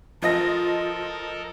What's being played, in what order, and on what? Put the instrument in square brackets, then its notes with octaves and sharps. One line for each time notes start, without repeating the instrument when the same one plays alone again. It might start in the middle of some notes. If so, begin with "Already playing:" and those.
[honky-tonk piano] F3 D#5 A#6 [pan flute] F4 [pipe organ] A4 A#4